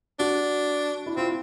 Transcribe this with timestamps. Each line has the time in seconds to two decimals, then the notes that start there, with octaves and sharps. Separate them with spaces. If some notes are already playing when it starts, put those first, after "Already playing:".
0.20 D4 F#4
1.06 E4
1.16 C4 F4